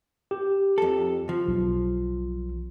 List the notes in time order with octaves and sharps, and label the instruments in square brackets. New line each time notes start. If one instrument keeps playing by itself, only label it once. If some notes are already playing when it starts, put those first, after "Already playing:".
[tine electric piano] G4
[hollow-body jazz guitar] F2 A4
F3
[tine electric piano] B1